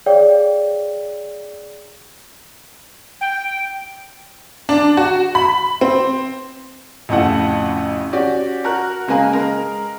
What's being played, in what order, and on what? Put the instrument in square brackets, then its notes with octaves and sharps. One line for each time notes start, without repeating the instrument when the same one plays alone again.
[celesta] G#4 C#5 D5 F5 G5
[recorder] G5
[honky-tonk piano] D4
F#4
B5
C4
[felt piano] A1 F2 C#3 A3 E4 F#5
C#4 F#4 G4 D5
F#4 A#4 A#5 F#6
C#3 G#3 A#3 B4 G#5 A#5
G#3 A#4